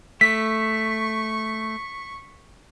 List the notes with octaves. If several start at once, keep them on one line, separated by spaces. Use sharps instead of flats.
A3 C#6 B6